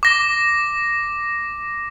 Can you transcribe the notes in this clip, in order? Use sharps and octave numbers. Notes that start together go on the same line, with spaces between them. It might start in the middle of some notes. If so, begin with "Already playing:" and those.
D6 A#6